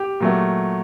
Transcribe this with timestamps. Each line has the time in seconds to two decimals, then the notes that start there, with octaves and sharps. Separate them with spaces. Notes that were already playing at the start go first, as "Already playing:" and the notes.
Already playing: G4
0.20 A#2 F#3 A3